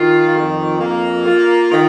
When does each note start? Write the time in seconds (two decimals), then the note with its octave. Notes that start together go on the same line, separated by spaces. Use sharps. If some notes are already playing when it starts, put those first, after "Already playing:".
Already playing: D#3 F4
0.36 F2
0.80 A#3
1.26 F4
1.71 D#3